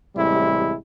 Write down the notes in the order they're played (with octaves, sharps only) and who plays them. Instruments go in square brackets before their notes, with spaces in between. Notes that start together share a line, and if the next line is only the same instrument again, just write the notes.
[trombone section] A1 C3 G3 G#3 E4